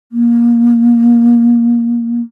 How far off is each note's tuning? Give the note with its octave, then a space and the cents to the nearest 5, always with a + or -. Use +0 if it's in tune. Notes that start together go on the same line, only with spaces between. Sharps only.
A#3 +20